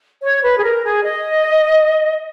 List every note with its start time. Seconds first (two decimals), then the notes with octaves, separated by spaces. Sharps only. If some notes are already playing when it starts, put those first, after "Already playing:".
0.22 C#5
0.43 B4
0.57 G#4
0.63 A#4
0.84 G#4
1.04 D#5